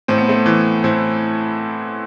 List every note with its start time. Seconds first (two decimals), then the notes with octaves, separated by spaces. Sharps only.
0.08 A2 C4
0.18 B3
0.28 A3 C4
0.46 E3
0.84 A2 C4 E4